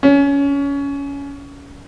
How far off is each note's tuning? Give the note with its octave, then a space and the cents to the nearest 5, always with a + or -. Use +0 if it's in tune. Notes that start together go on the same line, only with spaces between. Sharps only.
C#4 +20